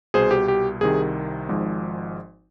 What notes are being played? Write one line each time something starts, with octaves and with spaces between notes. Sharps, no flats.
C2 B2 G#4 C5
G4
G4
C2 C3 D#3 G#4
G#1 G#2 F3